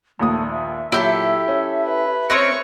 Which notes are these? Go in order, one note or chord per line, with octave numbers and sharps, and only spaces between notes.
A#1 D#2 A3 D#6
E5
A#2 F#3 E4 G4 A4
C#4
B4
C4 C#4 A#4 C#5 C6 C#6 F#6